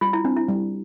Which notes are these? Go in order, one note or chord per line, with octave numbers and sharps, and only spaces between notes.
G3 F4
E4
C4 D4
E4
G3